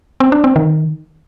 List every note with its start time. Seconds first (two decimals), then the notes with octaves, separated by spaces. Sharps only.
0.20 C4
0.32 D4
0.44 C4
0.56 D#3